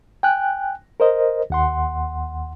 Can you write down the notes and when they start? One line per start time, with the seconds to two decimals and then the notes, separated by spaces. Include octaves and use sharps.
0.23 G5 G#5 F#6
1.00 A#4 C5 D#5
1.50 D#2 F#5 C6